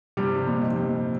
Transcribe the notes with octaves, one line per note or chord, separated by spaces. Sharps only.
G2 C3 G3
C3
F2 A#2
D#4
F2 A#2